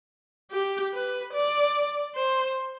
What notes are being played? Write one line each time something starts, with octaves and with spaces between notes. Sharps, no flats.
G4
B4
D5
C5